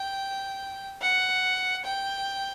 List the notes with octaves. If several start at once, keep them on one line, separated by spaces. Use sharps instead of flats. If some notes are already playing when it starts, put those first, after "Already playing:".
Already playing: G5
F#5
G5